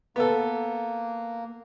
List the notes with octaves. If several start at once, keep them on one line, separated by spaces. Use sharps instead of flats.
A#3 B3 A4